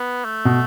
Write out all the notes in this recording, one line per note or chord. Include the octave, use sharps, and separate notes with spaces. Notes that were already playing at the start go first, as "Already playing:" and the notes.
Already playing: B3
A3
B2